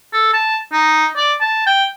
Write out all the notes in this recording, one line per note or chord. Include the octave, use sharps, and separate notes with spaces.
A4
A5
D#4
D5
A5
G5